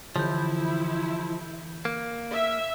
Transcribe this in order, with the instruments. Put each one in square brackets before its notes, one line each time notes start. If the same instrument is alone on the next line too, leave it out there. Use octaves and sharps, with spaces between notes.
[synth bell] D3 E3 G6 [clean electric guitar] F3 [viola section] E4
[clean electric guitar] A#3
[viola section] E5